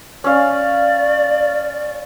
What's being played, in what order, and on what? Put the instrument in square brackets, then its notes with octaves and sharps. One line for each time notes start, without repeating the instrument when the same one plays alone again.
[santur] C#4 F5 [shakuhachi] D5